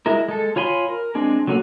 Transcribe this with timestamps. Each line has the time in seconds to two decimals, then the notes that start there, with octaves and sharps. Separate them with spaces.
0.06 G#3 E4 A#4
0.29 G#3 A4
0.56 F4 C#5 G#5 B5 C6
0.88 A#4
1.15 G#3 C4 D4 G#4
1.47 F#3 A3 A#3 C#4 F#4